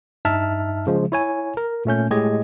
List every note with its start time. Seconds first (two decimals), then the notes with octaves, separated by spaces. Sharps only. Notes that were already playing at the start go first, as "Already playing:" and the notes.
0.25 G2 D#4 E5 A5 F6
0.87 C#3 F3 G#3
1.12 E4 C#5 G#5
1.57 A#4
1.85 A#2 A3 C#4 G6
2.11 A2 G#3 G4 G#4 D#5 G#6